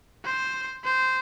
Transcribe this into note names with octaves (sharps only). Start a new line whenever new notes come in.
C5
C5